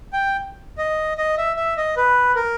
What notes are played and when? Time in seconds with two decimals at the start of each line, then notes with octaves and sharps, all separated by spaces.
0.13 G5
0.78 D#5
1.18 D#5
1.38 E5
1.56 E5
1.77 D#5
1.97 B4
2.35 A#4